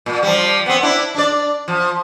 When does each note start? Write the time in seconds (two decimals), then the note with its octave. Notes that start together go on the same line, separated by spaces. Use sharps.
0.06 A#2
0.23 F3 G3
0.66 B3 C4
0.83 D4 E4
1.14 D4 D5
1.68 F3